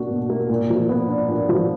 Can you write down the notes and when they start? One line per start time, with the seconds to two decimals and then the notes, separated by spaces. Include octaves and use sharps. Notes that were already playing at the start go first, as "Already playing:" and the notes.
Already playing: B2 A#3 D4 F#4
0.11 B2
0.30 A#3
0.49 A#2
0.70 F3
0.89 B3
1.08 D4
1.29 A#2
1.49 F3